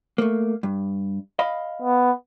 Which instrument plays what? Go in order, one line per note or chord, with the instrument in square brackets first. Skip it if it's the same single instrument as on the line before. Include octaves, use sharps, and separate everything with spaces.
[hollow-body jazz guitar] A3 A#3
G2
D#5 F5 B5
[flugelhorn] B3